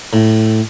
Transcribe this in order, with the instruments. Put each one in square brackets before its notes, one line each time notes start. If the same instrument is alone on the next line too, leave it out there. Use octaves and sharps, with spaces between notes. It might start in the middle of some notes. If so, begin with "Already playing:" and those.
[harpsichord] A2